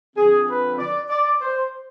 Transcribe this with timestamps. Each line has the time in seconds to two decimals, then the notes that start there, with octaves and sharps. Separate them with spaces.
0.15 D3 F3 C4 G#4
0.48 B4
0.78 D5
1.09 D5
1.41 C5